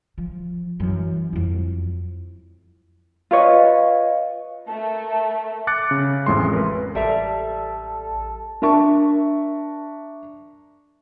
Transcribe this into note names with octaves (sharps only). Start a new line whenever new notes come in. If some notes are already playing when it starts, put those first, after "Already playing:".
F3
F#2 E3
F2 E4
F4 B4 C#5 D#5
A3 A#4 A5
D6 F#6 A6 C#7
C#3
A1 F2 A2 G#3 C6
A#4 B4
A1 G3 A4 E5 A#5
D4 A#4 E5 A5 C#6